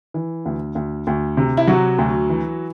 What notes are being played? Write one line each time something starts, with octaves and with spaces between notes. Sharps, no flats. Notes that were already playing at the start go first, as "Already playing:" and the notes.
E3
D2
D2
D2
C3
E4
C3 F#3 F#4
D2
E3